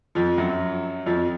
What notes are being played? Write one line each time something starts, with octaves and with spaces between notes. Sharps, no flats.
F2 F3
F#2 F#3
F2 F3